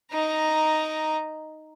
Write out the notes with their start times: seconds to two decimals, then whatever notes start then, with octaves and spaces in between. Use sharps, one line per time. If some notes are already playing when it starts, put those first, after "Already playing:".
0.12 D#4 A#5